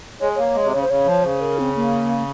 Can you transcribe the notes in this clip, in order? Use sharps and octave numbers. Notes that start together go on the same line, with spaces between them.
G#3 C#5
A#3 C#5
G#3
C3
C#3 C#5
C5
C#3 C#5
F3
C#3 C5
A#4
C4
A#3